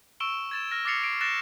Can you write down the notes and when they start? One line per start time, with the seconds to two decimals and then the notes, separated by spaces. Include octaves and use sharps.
0.20 C#6 E6 D7 E7 G7
0.51 G#6 A6 E7
0.71 F6 A#6
0.85 D6 F6 A6 C7 C#7 F7
1.02 C7 D7 F7
1.21 F6 F#6 A6 A#6 D7 E7